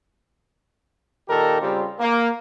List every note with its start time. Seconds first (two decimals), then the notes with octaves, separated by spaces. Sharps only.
1.28 A#2 D#3 G4 A4 A#4
1.61 C#3 G3 C4 F4 G4
1.99 A#3